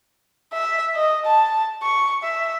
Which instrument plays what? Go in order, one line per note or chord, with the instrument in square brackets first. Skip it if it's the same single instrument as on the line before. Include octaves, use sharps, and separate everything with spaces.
[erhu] E5
D#5
A5
C#6
E5